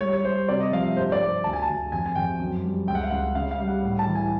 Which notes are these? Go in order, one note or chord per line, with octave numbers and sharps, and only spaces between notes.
G3 C#5
C#5
G3 C5
C3 D5
D#5
F3 F5
E5
G2 C5
D5
G2
D2 A5
G#5
A5
D2
F2 G#5
G#5
F2 G5
F#2
G3
C#2 G5
F#5
F5
C#2 F#5
C#3 F5
F5
G3
F#5
A2
A5
E3
G#5